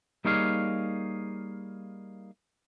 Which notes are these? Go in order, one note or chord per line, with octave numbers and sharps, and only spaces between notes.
G3 A#3 D#4 G#4 C#5 F5